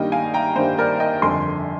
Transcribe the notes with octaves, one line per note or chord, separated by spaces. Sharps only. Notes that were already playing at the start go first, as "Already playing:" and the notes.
Already playing: G2 D#3 G3 A#3 D#5 G5
F5 G#5
G5 A#5
G2 D#3 G3 A#3 C5
A#4 D5
D#5 G5
G1 F2 D3 G#5 C6